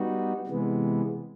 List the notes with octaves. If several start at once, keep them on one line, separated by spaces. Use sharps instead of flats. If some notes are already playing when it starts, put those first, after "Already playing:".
Already playing: G3 B3 D#4 F#4
C3 E3 G#3 B3